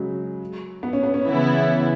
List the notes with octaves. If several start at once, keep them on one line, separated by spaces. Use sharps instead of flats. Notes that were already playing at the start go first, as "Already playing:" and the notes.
Already playing: C#3 F#3 G#3
B3
C#4
B3
C#4
C#3 E3 B3 E4